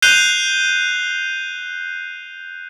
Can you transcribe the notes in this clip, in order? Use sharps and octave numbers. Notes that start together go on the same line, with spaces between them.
F#6 G6 C7 D#7 F7 G7